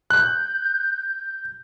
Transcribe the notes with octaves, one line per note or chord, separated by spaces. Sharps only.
F#6 G6